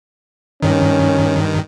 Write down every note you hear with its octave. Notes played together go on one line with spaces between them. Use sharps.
G2 D#3 C#4